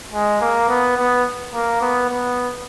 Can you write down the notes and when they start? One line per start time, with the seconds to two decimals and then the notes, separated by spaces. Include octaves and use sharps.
0.14 G#3
0.41 A#3
0.69 B3
0.98 B3
1.54 A#3
1.82 B3
2.10 B3